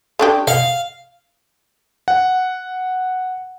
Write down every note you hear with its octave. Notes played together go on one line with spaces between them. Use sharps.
A3 D4 G4
D#5 F5 F#5
F#5